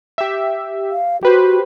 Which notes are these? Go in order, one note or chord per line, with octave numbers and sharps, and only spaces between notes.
G4 E5
F5
F#4 G4 B4 C5